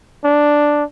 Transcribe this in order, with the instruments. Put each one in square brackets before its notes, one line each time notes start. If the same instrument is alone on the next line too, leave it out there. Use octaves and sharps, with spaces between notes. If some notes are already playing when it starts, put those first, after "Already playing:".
[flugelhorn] D4